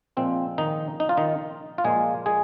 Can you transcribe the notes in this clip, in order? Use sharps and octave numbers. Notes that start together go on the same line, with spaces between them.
A#2 F3 G#3 C4
D#3 D#4
D#4
F4
D#3 D#4
F4
A#2 F3 G#3 A#3 G#4
G#3 G#4